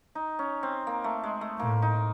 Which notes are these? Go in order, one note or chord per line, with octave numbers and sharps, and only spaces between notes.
D#4
C#4
C4
A#3
A3
G#3
A3
A2 A#3
D#4